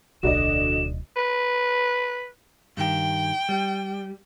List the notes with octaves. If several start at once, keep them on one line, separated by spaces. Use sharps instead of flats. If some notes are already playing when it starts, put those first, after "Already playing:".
D1 B1 D3 F#4 D5 D#5 E7
B4
G2 D#3 G5
G3